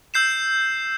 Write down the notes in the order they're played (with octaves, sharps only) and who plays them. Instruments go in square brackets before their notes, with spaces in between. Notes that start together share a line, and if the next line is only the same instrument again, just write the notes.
[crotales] E6 G6 C7 E7